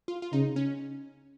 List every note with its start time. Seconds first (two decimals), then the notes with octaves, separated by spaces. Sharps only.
0.08 F4
0.22 F4
0.33 C#3 D#4
0.56 C#4